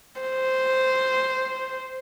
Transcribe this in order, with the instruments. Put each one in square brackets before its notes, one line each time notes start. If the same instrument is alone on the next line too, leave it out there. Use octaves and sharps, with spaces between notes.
[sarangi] C5